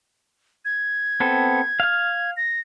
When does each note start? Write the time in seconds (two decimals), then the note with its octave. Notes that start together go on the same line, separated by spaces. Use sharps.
0.65 G#6
1.20 B3 C4 A4
1.80 F5 F6
2.37 A#6